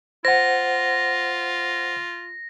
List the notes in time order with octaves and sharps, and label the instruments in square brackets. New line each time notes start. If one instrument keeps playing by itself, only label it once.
[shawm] F4 [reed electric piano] C5 F#5 [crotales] A#6